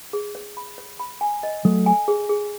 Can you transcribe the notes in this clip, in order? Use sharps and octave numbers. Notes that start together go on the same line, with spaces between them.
G#4
C#5
B5
C#5
B5
G#5
D#5
F#3 A3 A4
G#5
G#4
G#4